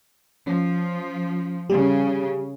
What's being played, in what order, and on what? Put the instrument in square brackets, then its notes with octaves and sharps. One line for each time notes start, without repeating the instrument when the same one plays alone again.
[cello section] F3 [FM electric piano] C#4
[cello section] C#3 [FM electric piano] G3 G4